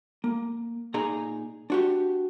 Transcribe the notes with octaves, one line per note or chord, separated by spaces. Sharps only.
A#3
A#2 D#4 G#4 A#5
D4 F#4 G4